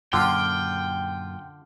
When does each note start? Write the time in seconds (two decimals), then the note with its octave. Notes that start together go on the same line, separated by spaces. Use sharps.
0.13 F#2 A#2 D3 F4 G5